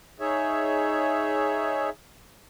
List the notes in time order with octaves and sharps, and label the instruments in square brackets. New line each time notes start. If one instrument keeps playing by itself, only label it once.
[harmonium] D#4 G#4 C#5 E5